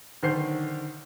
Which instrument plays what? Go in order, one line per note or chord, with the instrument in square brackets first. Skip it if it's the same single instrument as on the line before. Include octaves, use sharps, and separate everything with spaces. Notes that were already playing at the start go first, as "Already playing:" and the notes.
[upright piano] B1 D3 D#3 C5 G6 C7